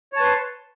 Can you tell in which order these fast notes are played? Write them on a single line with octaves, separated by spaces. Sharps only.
C#5 A5 B4 C6